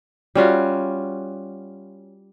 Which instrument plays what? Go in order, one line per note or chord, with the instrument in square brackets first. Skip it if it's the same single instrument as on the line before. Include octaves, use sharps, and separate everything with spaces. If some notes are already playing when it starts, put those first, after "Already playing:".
[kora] G3 C#4 F4 F#4